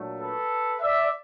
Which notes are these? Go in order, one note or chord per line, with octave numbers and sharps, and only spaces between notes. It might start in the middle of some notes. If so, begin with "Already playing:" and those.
Already playing: A#2 F#3 A3 D4
A4 B4
D5 E5